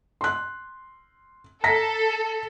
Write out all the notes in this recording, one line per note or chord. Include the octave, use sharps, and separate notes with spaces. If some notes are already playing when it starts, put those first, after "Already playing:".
C6 F#6
A4 A#5 A#6 B6